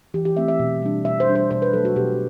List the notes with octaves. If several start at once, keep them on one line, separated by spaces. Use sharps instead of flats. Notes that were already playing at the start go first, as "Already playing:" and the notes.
E3 G4
G4
A3 C4 E5
E5
B2
G3 D4
B2 E5
C5
G3 D4
C5
B2 C5
B4
F#3 A3 A4
F#4
B2 G4